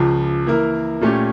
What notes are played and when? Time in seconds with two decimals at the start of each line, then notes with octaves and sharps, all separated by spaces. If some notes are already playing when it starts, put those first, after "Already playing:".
Already playing: C#2 C#3 F3
0.47 E3 A#3 E4 A#4
1.01 A#2 A3 C#4 G4